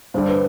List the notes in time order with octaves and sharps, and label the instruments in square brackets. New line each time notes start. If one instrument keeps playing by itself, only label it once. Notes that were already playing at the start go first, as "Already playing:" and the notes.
[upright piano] G2 D3 G3 [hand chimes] C5
[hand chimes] B4